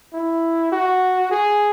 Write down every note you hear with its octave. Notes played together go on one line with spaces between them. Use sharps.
E4
F#4
G#4